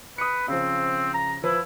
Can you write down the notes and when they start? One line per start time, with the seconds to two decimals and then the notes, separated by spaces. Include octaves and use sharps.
0.18 B4 D#6 C#7
0.48 C#3 F3 C4
1.14 A#5
1.44 F3 E4 B4